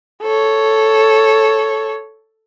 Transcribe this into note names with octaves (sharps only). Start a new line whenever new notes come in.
A4 C#5